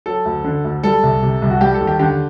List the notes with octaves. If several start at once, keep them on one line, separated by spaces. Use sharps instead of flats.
F#3 A4
D2
D3
D2
G3 A4
C2
C3
C2
F#4
G3 G4
A4
D#2
G4
D3 G4